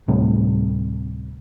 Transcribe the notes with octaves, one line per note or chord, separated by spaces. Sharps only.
D2 A2 C3 G3